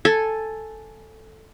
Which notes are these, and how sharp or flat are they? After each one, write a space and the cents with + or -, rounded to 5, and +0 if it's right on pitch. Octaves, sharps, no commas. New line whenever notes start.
A4 +0 G#5 +0